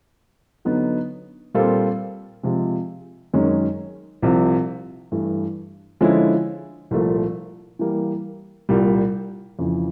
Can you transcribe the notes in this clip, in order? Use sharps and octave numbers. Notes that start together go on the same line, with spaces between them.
D3 F#3 B3 D#4
A#2 G3 C4 F4 A4
C3 F3 G#3
F#2 D#3 G#3 C#4
C2 C3 F3
G2 E3 A3
D3 F3 G#3 C#4 E4
C2 A#2 F3 A3
E3 G3 A#3
C2 A#2 G3
F2 C#3 E3